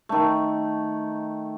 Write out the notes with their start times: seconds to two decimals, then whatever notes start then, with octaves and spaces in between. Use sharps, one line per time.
0.09 D#3 A3